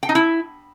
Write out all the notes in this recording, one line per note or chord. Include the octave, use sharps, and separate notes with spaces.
G5
D#4
E4